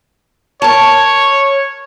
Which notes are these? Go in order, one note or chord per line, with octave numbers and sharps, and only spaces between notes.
A#4 C#5 A5